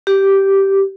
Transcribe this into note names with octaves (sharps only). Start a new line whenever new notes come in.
G4